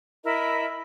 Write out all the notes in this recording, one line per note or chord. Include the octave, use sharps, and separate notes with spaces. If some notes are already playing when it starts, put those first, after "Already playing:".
E4 A#4 D#5 B5